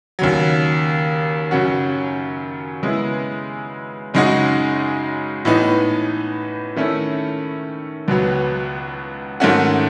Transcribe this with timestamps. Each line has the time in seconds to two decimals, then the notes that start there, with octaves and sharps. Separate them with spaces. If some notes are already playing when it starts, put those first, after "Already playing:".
0.19 D#2 C#3 F#3
1.51 F#2 C#3 F#3 C#4 F#4
2.83 C#3 G#3 B3 E4
4.14 F#2 C#3 G#3 D#4 F#4
5.45 A2 E3 B3 D#4
6.76 D#3 A3 C#4 E4
8.08 C#2 B2 F#3 B3
9.40 G#2 D#3 A3 C#4 F#4